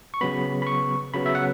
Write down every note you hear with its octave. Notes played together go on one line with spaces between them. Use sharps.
C#6
C#3 F#3 B3 B5
B5
C#6
C#3 F#3 B3 B5
E5
F#5